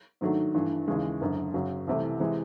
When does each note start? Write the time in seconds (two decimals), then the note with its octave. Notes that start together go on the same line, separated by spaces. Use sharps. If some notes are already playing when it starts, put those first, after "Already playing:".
0.21 G#2 D#3 F#3 A3 D4
0.54 G2 E3 A3 D4
0.88 D#2 C#3 E3 G#3
1.21 F#1 F#2 D3
1.54 F#2 C#3 F#3
1.88 C2 C3 E3 A3
2.20 C3 E3 G#3